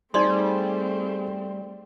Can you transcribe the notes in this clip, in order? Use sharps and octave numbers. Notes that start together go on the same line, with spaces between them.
G3 A3 C4 D#4 G#4 C5 D5 C6